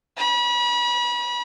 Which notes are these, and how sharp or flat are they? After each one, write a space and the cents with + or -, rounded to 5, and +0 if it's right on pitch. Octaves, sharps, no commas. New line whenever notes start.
B5 -35